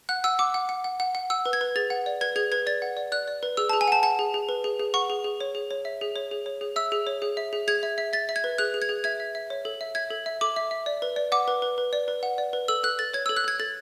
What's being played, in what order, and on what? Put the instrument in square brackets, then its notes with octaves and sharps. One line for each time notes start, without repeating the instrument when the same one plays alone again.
[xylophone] F#5 F#6
F#5 E6
F#5 D6
F#5
F#5
F#5
F#5
F#5
F#5 E6
B4
G#6
B4
G#4 A6
F#5
D5
B4 G#6
G#4 G#6
B4 G#6
D5 A6
F#5
D5
D5 F#6
D5
B4
G#4 E6
A5
G#4
G#5
F#5 A5
F#5 A5
G#4
G#4
B4
G#4
G#4
F#5 C#6
G#4
G#4
C#5
G#4
C#5
E5
G#4
C#5
G#4
C#5
G#4
E5 E6
G#4
C#5
G#4
E5
G#4
G#4 G#6
E5
E5
E5 A6
E5
G#6
B4
G#4 F#6
G#4
G#6
G#4
E5 G#6
E5
E5
C#5
A4
E5
E5 G#6
A4
E5
A4 D6
E5
E5
D5
B4
D5
F#5 D6
B4
B4
B4
D5
B4
F#5
D5
B4
A4 E6
A4 F#6
A4 A6
C#5 G#6
E6
A4
F#6
A4 G#6
A4 A6